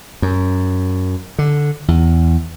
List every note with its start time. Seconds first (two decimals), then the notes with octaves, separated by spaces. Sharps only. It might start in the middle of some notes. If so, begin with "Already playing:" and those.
0.22 F#2
1.39 D3
1.88 E2